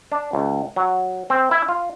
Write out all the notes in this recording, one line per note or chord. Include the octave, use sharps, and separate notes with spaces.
D4
C#2
F#3
C4
E4
F4